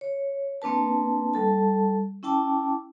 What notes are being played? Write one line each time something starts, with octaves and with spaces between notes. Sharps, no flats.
C#5
A#3 C4 D4 B4 A5
G3 A4 A5
C#4 E4 G5 A5 D6